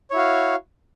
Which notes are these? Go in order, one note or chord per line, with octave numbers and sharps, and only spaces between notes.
E4 F#4 C#5 F5